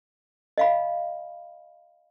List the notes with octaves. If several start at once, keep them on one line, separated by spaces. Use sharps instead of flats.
D#5 F5 B5